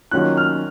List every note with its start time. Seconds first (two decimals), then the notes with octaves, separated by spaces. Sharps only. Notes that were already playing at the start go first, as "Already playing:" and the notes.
0.11 D#3 F#3 A#3 C#4 F4 F#6
0.37 F6